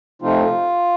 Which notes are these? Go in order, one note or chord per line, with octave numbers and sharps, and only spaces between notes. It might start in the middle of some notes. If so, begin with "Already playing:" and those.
C3 F3 A3 C4 D#4 F4